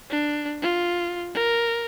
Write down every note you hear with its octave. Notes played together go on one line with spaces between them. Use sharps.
D4
F4
A#4